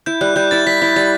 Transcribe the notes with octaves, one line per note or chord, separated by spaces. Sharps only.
E4 G6
G3 F#6
G3 G6
E4 A6
G3 B6
E4 B6
G3 A6